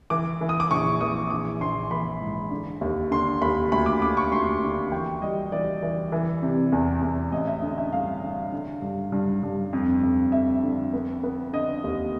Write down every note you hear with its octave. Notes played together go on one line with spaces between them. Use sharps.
E3 D6
E3
D#6
D6
A#1 C#6
E3 D#6
A#1 D6
A#1 C6
E3 B5
G#2
D3
D#2
D3 C6
D#2 B5
D2 B5
D6
D3 D6
C#6
D2 C6
D3
E3 G5
G3 D#5
E3 D5
E3
E3
C3
E2
E2
A1 D#5
E5
D3
E5
G2 F5
D3
D3
G2
G2
G2
F2
F2
F2 E5
D3
B3
B3
D3 D#5
D#2